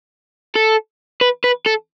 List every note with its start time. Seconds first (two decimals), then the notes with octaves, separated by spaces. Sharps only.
0.55 A4
1.21 B4
1.44 B4
1.66 A4